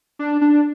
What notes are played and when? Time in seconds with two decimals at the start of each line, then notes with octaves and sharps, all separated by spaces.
0.19 D4
0.41 D4